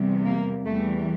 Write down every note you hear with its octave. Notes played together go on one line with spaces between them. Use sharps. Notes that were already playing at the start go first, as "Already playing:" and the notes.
Already playing: E2 C3 G3
A#3
E2 E3 G3 A3